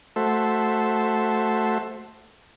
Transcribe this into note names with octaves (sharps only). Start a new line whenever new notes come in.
A3 F#4 A4 C5 E5